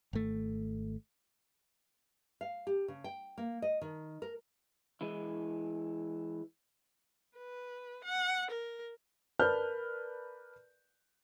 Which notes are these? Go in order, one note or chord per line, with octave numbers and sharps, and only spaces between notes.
G#1 A3
F5
G4
C#3
G5
A#3
D#5
D#3
A#4
E3 G#3 E4
B4
F#5
A#4
A#4 B4 D5 A5 F6 G6